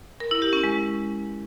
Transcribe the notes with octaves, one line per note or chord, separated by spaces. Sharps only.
A#4
E4
G4
C#4
G#3